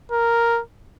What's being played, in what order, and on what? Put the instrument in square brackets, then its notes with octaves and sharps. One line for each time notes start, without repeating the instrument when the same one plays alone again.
[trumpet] A#4